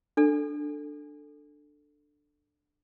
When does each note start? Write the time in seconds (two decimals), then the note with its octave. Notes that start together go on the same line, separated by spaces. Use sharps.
0.17 D4 A4